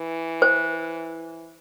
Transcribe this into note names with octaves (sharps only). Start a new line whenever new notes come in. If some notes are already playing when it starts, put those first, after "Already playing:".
Already playing: E3
C5